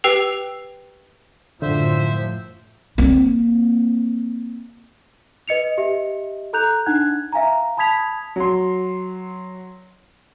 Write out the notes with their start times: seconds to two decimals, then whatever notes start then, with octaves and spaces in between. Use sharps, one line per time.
0.04 G4 B4 G5 E6 C7 F7
1.62 F#2 A2 D3 F3 C5 E5
2.98 A#3 C4
5.48 B4 D#5 C#7 F7
5.78 G4 D#5 E5
6.53 A4 A#5 F#6 G6 F7
6.86 D4 D#4 F#5 F#6 G#6
7.32 E5 F5 G#5 A#5
7.77 A5 B5 D#6 G#6 B6 F7
8.36 F#3 C6